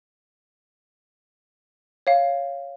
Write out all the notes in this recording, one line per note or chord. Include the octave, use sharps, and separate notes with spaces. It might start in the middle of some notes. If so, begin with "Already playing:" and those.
C#5 F5